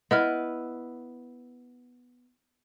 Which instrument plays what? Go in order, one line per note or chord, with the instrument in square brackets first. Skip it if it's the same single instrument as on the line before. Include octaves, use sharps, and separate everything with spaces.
[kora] B3 E4 [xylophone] D#5 F6